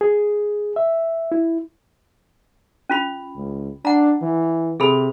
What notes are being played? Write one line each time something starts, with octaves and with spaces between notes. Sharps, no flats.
G#4
E5
E4
C#4 F4 B5
C#2
D4 F#5 A#5
E3
C3 G#4 A4 B5